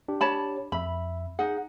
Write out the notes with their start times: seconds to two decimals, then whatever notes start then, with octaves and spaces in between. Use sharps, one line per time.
0.08 D4 G4
0.21 C#5 A5 B5
0.72 F2 E5 B5
1.39 D#4 G#4 F#5